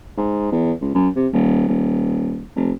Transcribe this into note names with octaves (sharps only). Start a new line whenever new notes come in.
G#2
E2
C#2
F#2
C3
D#1
D#1
F1